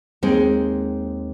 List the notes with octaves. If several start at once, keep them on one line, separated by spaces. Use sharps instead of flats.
D#2 G#3 C4